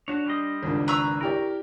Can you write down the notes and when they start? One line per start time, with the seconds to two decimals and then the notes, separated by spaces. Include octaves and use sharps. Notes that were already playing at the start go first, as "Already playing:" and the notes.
0.08 D4 F#4 C#5
0.27 G3 C5 D#5
0.63 G#1 C#2 D4
0.88 B4 A#5 C#6 E6
1.21 E4 G4 A#4 D5